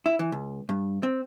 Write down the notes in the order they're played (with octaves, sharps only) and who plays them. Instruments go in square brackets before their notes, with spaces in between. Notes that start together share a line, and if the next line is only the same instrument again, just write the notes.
[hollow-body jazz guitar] E4
E3
C#2
G2
C4